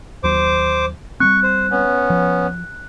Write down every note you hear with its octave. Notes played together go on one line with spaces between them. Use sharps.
D#2 F#3 C5 D6
G3 G#3 C4 C#6 F#6
C5
B3 C#4
F3